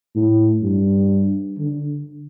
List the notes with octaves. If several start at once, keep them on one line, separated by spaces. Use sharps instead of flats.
A2
G2
D3